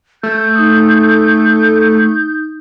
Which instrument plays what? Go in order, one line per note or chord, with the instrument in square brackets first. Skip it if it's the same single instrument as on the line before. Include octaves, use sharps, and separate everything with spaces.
[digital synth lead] A3 [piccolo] G6
[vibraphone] D#4 D#6